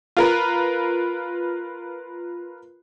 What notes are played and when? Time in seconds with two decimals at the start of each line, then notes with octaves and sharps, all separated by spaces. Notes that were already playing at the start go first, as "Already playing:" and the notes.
0.17 F4 A#4 B4